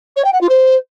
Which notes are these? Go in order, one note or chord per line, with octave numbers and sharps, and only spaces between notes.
C#5
G5
F#5
F4
C5